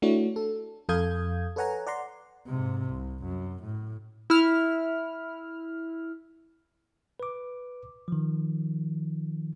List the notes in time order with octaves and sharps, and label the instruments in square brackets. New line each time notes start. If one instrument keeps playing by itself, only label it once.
[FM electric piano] A3 D4 E4 F#4 C#5
A4
F2 A4 F5 D#6 G6 G#6
A4 B4 C#5 F#5 G#5 A#5
D5 F#5 A#5 C6
[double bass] G#2 C3
C2
F#2
A2
[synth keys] E4 F6
[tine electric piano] B4 D6
D#3 F3